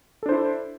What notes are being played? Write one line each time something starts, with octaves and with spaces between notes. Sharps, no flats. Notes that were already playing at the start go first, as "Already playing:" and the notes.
D4 E4 A4 C5